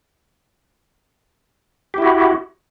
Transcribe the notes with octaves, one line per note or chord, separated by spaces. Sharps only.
E4 F#4 G4